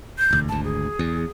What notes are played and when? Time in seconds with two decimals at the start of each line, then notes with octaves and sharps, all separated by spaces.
0.18 G6
0.31 E1 D2
0.49 G#1 D2 A5
0.64 G#4
0.99 E2